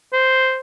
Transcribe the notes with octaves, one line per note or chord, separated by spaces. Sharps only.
C5